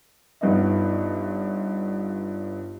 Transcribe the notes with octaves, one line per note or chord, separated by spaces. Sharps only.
G1 G2 B3 D#4 D#5 E5